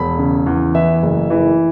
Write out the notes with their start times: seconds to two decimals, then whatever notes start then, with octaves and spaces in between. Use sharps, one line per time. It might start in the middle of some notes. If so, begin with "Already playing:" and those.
Already playing: E1 B5
0.19 C#3
0.46 E2
0.75 E3 E5
1.03 F#1
1.30 E3